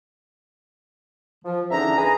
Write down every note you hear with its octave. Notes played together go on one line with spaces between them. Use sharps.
F3
E2 D3 C#4 D#4 E5 A#5
G#4 B4 A#5